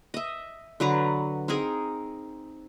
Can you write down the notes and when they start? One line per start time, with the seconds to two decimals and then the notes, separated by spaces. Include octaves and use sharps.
0.14 D#5 E5
0.80 D3 F#3 B4 A#5
1.48 C4 D#4 G#4 A#4